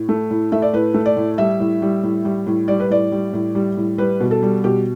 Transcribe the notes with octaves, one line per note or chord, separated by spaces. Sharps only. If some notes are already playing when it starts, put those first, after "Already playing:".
Already playing: A2
A3
A2
A3 E5
D5
A2 B4
A3
D5
A2
G3 E5
A2
G3
A2
G3
A2
G3 D5
B4
A2 D5
G3
A2
G3
A2
G3 B4
B2
A4
G3
B2 G4